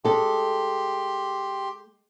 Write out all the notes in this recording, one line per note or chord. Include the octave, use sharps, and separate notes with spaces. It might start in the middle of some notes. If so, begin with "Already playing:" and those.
G#3 G4 A4 C6